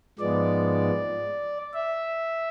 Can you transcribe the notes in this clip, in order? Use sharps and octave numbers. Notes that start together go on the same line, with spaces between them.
G#2 F3 G#3 B3 D5
E5